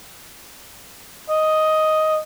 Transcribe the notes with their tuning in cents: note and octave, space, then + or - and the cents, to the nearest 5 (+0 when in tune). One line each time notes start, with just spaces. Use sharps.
D#5 +5